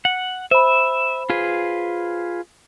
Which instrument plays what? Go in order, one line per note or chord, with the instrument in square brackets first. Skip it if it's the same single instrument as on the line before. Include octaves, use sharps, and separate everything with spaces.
[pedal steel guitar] F#5
[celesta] C5 B5 [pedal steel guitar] E5
[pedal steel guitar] F4 G#4 B4